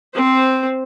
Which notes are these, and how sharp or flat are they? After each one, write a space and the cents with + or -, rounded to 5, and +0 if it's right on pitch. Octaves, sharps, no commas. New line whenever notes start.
C4 +0 C5 +0